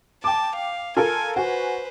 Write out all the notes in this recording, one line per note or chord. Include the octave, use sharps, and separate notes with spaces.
G5 A5 D6
F5
F4 A4 A#4 G#5
F#4 B4 C5 G#5